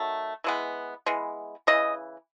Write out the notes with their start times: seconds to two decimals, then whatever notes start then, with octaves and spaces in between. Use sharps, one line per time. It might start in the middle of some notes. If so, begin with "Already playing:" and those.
Already playing: D#3 F#3 A3
0.44 E3 G#3 B3
1.06 E3 G#3 B3
1.67 C#3 E3 D#5